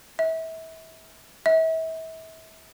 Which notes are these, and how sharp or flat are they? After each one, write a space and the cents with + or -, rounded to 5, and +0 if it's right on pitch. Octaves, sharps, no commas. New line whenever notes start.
E5 -30
E5 -35